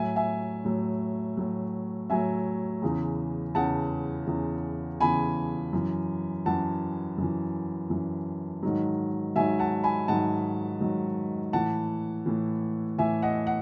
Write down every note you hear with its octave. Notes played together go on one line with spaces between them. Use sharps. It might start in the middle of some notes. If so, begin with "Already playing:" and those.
Already playing: A2 F#3 E5 G#5
E5 G#5
A2 F#3
A2 F#3
A2 F#3 E5 G#5
E2 C#3 E3
E2 C#3 E3 F#5 A5
E2 C#3 E3
E2 C#3 E3 G#5 B5
F#2 E3
F#2 E3 F#5 A5
F#2 E3
F#2 E3
G#2 D#3 F#3
G#2 D#3 F#3 E5 G#5
F#5 A5
G#5 B5
G#2 D#3 F#3 F#5 A5
G#2 D#3 F#3
A2 E3 F#5 A5
A2 E3
A2 E3 E5 G#5
D#5 F#5
F#5